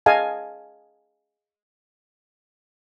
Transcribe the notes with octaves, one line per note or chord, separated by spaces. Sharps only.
G#4 D#5 F5 G#5 A5